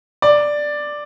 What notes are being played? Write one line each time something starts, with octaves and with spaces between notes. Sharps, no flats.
D5